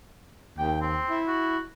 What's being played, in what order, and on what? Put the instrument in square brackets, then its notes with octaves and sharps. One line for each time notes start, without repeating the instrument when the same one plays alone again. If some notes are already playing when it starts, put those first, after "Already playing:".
[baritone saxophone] D#2 [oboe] G5
[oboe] C4
[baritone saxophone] E4
[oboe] F#4